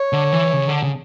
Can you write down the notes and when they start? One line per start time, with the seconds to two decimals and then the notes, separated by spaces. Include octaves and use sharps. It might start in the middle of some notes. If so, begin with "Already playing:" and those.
Already playing: C#5
0.13 D3
0.32 E3
0.53 C#3
0.68 D3
0.83 C#3